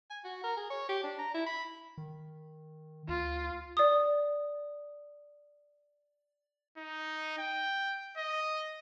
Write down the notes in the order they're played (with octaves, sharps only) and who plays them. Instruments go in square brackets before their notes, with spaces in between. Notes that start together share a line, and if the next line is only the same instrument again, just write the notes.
[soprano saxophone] G#5
F#4
A#4
G#4
C#5
G4
D4
A#5
E4
B5
[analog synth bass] D#3
[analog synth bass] D2 [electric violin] F4
[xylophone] D5 D#6
[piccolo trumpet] D#4
G5
D#5